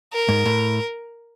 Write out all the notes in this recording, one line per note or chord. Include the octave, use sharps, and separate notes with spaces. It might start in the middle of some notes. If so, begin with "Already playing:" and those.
A#4
G#2
A2